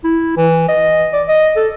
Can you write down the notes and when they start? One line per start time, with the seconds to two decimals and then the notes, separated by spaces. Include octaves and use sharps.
0.04 E4
0.37 E3
0.69 D#5
1.13 D5
1.29 D#5
1.56 A4